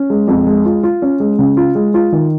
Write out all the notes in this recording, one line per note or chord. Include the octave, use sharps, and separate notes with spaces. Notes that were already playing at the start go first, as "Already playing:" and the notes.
Already playing: C#4
G#3
F2
G#3
F4
F4
C#4
G#3
C#3
F4
G#3
F4
D#3